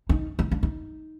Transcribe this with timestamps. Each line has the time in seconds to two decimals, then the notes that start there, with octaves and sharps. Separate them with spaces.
0.09 D#4
0.39 D#4
0.52 D4
0.63 D#4